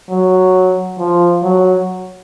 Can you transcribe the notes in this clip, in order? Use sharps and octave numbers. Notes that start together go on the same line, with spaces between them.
F#3
F3
F#3